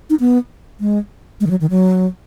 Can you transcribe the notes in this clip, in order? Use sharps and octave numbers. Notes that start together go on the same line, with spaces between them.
D#4
B3
G#3
G#3
D#3
F#3
D#3
F#3